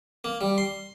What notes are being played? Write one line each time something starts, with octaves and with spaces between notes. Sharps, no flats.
A#3
G3
C6